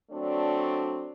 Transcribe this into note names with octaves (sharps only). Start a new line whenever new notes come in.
F#3 A3 C4 D4